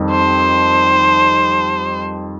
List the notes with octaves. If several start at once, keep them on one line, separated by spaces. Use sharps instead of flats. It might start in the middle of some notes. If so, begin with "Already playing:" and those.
Already playing: F2 D#3 G3
C5